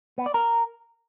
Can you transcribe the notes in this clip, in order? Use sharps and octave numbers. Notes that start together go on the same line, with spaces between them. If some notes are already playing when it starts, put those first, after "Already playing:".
B3
D5
A#4